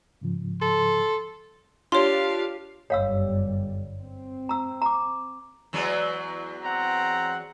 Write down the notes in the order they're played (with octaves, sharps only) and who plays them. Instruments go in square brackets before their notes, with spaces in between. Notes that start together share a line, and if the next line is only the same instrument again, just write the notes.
[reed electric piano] G#2 C#3 F3
[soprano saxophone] A4 [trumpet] C6
[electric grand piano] D4 F4 [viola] G4 F5 [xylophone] C#5 C6
[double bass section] G1 F#2 G3 [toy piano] C#5 F5 E6
[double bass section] C4
[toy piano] A#5 E6
A#5 D6
[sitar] E2 F#3 G#3
[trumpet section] C4 F#5 A#5